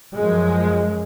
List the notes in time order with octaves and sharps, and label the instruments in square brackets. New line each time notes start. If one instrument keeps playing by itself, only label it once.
[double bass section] F#2 F3 G#3